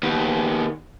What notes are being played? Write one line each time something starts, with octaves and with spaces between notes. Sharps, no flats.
D#2 B3